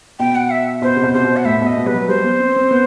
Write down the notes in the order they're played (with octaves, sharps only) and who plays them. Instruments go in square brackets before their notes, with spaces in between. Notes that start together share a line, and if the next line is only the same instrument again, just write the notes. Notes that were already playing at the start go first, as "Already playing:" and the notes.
[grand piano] B2 [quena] G5
[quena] F#5
E5
[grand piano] B2 [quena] C5
[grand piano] C3
B2
[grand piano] C3 [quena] C5
[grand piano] B2
[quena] F#5
[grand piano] A2 [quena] E5
[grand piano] B2
[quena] D#5
[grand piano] B2
[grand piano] G3 [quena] B4
[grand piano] F#3
[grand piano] G3 [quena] C5
[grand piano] B3
C4
C4
B3